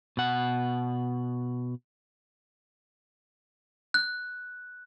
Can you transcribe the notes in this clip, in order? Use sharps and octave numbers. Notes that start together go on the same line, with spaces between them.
B2 F#5
F#6